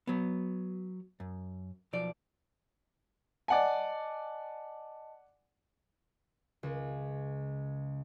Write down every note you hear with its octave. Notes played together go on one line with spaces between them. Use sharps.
F#3 B3
F#2
B1 F3 D5
D5 D#5 F#5 G#5 A5
C#2